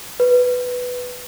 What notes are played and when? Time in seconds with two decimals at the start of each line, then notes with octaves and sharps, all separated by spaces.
0.20 B4